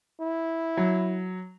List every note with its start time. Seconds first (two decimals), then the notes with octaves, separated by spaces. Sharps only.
0.20 E4
0.77 F#3